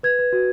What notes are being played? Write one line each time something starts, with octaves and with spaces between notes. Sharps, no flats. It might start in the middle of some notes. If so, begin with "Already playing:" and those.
B4 G#6
B4
F#4